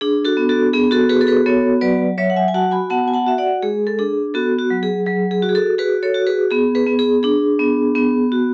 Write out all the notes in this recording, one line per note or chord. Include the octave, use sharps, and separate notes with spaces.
D4 G#4
F#4 A4
B3
F#4 A4
B3 G#4
F#4 A4
F#4 G#4 B4
A4
G#4 B4
B3 A4 C#5
F#3 B4 D5
F#3 C#5 E5
F#5
E5 G#5
G#5
F#4 F#5 A5
G#5 B5
B3 F#5 A5
G#5
F#5 A5
F#4 E5
D5 F#5
G#3 G#4
A4
D4 G#4
B3 F#4 A4
F#4
F#3
G#4
F#3 G#4
G#4
F#4
G#4
F#4 A4
F#4 G#4 B4
A4 C#5
F#4
G#4 B4
B3 G#4
G#4 B4
B3
G#4
D4 G#4
B3
B3
F#4